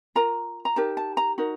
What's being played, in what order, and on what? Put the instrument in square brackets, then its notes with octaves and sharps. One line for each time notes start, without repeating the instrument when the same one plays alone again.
[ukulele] F4 A#4 A#5
A#5
D#4 G4 A#4 A5
A5
A#5
D#4 F#4 A#4